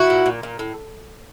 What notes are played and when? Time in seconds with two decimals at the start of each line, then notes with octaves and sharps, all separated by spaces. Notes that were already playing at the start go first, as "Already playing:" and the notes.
Already playing: E4 F#4
0.10 A#2
0.26 A#2
0.43 A#2
0.59 A2